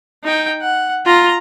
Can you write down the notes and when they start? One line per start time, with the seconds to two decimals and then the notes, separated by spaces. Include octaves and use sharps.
0.24 D#4 G5
0.61 F#5
1.06 F4 A#5